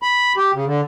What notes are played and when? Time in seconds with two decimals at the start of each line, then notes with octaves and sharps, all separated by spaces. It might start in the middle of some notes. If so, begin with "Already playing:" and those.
0.02 B5
0.37 G4
0.54 C#3
0.66 D3